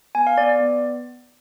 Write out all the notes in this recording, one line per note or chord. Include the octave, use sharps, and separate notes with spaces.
B3 G#5
F5
B3 D5
D5
B3